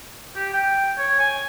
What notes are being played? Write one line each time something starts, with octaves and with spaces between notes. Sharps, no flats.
G4
G5
C#5
G#5